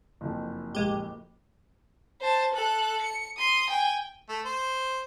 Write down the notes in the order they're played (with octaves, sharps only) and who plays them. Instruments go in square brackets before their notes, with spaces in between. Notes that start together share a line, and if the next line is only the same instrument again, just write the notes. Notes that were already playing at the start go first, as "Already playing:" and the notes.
[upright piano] F#1 F2
[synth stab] A#1 G#3 G4
[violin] C5 A5
A4 F#6
C#7
C6 D#6
G5 G#5
[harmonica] A3
C5